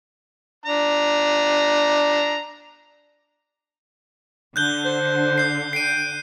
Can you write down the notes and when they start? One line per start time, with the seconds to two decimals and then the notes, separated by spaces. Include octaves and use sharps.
0.66 D4 A#5
4.56 D3 F#6 G6 G7
4.85 C5
5.38 G6 C7
5.73 G5 C7 D#7